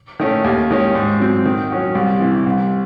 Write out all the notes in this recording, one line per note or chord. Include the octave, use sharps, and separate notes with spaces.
D#3 A3 C#4
D#2
D#3 G#3 C#4
G#2
F#3 C4
D#3
F#3 C#4 F#4
C2
C3 E3
C2